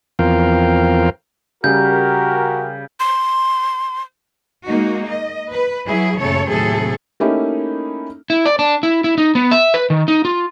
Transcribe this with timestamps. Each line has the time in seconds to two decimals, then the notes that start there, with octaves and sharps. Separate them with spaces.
0.19 E2 F3 C4 A#4 F5 G5
1.64 C#3 G3 F#4 G4 A#4 G6
3.00 C6
4.66 G#3 A#3 D#4 F#4
5.07 D#5
5.51 B4
5.87 F#3 E4 G#4
6.19 F#2 A#2 C#3 A3 A4 C#5
6.49 D#2 A2 C3 F#3 G#4 A4
7.20 A3 A#3 C#4 D#4 E4 G4
8.30 E4
8.45 D5
8.59 D4
8.83 E4
9.04 E4
9.18 D#4
9.35 B3
9.51 E5
9.74 B4
9.90 D#3
10.08 D#4
10.25 F4